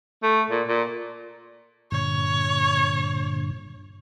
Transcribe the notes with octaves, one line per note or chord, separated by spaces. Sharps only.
A3
A#2
A#2
G2 A#2 D3 C#5